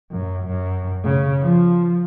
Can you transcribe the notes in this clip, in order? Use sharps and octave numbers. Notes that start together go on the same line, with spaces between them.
F#2
F#2
C#3
F3